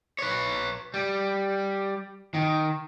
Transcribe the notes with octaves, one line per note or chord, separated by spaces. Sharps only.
B4 C#5
G3
D#3